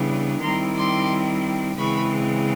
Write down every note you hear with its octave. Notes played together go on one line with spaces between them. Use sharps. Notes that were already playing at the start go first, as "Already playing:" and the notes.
Already playing: C#3 E3 G3 B3 D4
D#3 G3 C4 E4 A#5 C6
C6 D6
C#3 E3 G#3 C4 B5 C#6